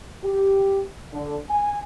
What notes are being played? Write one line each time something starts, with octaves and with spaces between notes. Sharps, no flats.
G4
D3
G#5